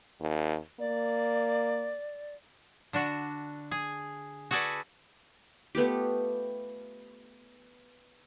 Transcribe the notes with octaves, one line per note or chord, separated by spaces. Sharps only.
D#2
A#3 D5
D3 D4 F#4
G#4
F#4 G#4 A4 B4 D5 G#5
A3 B3 F4 G4